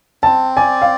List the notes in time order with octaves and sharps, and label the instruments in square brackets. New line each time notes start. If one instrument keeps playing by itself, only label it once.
[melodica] C4 [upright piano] A5
[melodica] D5 [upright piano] G#5
[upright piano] F5